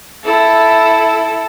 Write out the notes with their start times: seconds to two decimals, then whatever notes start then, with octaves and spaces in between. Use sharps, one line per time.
0.24 E4 A4